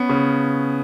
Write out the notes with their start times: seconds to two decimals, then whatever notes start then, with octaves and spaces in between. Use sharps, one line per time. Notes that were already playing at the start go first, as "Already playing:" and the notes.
Already playing: B3 C#4
0.09 C#3